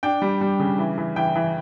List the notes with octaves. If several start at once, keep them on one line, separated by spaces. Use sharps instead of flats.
D4 G5
G3
G3
C#3
E3
E3
E3 G5
E3